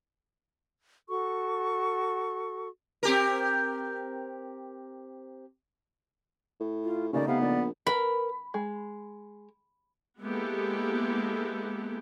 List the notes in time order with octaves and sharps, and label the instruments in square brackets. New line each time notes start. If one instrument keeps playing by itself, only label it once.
[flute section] F#4 A4 C#6
[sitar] C4 G4 A#4
[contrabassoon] A2
[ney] F4
[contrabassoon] D#2 [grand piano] C#3 A3 D#4 [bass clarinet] C#4 [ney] D5
[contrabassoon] C3 [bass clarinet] B3 [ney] F5
[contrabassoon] A#1 [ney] D5
[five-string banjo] A#4 B4 [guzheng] B5
[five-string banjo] G#3
[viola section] G#3 A#3 B3 E4 G4 A4